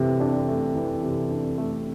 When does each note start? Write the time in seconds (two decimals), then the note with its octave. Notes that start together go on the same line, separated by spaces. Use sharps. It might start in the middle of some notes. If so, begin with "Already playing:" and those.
Already playing: C3 E3 A3
0.20 D4
0.48 A3
0.75 E3
1.03 C3
1.30 D4
1.58 A3